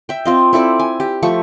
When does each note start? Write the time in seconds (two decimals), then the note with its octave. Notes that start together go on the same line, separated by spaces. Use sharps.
0.09 E5 G5
0.25 C4 F4 D#5
0.53 C4 E4 A4 D5
0.80 G#5
1.00 G4
1.23 F3 A3 C#6